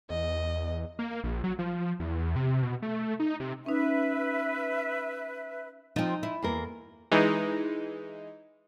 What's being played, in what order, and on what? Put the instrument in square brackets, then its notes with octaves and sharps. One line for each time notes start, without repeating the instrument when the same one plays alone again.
[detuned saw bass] E2 [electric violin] D#5
[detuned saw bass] A#3
A#1
F#3
F3
E2
C3
B2
A3
D#4
C3
[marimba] C#4 D#4 [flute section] B4 E5
[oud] F3 C4 [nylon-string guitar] D#4
[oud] E4
[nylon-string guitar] E2 A#3 A#4
[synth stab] E3 G#3 D#4